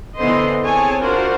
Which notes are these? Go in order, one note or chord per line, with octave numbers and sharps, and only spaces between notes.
D3 E3 B3 C5 D#5 C6
C4 G#4 C#5 G#5 A5
D4 F4 F#4 A#4 C5